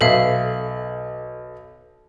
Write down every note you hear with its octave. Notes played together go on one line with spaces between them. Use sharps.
B1 A4 E5 F5